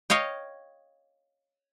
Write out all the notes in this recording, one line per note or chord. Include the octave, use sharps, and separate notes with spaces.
C#5 D#5 F5 G5